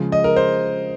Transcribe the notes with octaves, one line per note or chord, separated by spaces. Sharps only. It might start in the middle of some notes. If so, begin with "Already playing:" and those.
Already playing: C#3 F3 G#3
D#5
A#4
C5